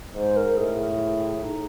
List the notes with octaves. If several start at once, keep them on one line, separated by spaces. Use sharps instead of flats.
G#2 C5
A#4
A2 G#4
D#4